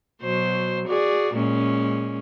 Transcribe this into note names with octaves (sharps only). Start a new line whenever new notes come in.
B2 F#3 C5
F#4 G#4 D5
A#2 G#3 C#4